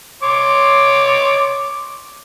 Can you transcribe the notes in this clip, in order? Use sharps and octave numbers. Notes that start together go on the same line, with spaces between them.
C#5 C6 D6